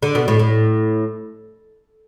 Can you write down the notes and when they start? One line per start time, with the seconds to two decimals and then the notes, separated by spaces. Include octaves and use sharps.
0.03 D3
0.15 B2
0.28 A2
0.39 A2